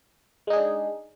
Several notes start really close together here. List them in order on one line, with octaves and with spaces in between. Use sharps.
G#3 D#4 G#4 D4